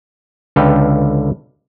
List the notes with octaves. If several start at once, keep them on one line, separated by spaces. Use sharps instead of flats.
C#2 D3 A4 B4 F5 G5